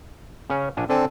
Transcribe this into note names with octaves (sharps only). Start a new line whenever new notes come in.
C#3 C#4
A#1 D4 G#5
D3 C4 D4 A4 G#5